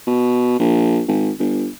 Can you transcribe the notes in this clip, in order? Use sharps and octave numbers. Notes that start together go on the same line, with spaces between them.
B2
A#1
G#1
G1